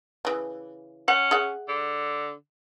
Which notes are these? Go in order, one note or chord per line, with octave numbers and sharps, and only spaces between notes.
C#3 E3
C#4 F#5
G#4 E5 F#5
D3